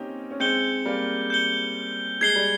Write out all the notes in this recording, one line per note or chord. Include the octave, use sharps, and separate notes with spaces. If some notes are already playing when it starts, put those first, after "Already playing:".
Already playing: A#3 C4 C#4 D#4 G4
C#4
G#3 C4 G6 C#7 G7
G3 A#3
G6 C#7 G7
G#3 G#6 C7 G7
G3